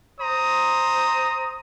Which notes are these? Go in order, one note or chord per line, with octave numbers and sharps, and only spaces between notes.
C5 A#5 D#6